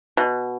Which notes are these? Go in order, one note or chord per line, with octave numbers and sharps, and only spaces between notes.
B2